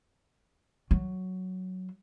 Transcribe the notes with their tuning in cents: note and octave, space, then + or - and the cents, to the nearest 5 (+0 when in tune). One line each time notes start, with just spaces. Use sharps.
F#3 +5